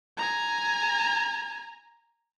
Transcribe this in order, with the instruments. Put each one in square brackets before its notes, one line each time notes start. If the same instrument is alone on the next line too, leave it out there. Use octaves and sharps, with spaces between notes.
[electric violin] G#5 A#5